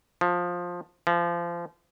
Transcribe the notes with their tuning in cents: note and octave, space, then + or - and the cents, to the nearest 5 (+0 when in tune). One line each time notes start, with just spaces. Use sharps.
F3 +15
F3 -25